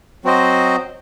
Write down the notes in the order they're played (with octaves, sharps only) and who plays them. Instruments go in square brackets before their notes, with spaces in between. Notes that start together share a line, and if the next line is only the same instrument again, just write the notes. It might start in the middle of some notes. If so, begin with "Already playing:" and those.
[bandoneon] F#3 C4 F#4 C5 D#5